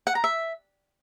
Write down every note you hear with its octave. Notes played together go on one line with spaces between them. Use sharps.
F#5
A#5
E5